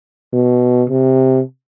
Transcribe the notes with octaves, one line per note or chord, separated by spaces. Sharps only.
B2
C3